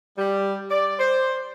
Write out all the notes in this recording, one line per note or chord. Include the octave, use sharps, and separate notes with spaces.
G3
D5
C5